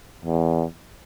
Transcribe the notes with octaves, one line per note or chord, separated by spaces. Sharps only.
E2